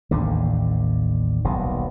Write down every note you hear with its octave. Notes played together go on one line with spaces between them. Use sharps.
A1 D#2 D3
D#1 B1 B2